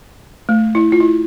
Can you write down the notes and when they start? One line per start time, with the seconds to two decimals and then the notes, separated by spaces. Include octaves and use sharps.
0.49 A3
0.75 E4
0.92 F4
1.00 E4